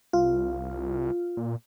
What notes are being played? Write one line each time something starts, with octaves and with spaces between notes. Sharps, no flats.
C2 F4
A#2